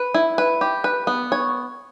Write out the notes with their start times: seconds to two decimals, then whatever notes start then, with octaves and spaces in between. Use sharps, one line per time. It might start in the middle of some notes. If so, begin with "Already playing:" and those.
Already playing: B4
0.14 E4
0.38 B4
0.61 G4
0.84 B4
1.07 B3
1.32 C#5